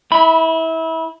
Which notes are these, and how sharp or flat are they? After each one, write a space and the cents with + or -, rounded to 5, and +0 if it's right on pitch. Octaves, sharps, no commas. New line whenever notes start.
E4 -25 B5 +0